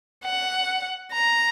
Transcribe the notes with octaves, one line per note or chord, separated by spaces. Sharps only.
F#5
A#5